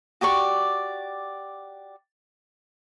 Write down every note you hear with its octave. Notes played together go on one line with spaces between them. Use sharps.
F#4 G4 D5 C#6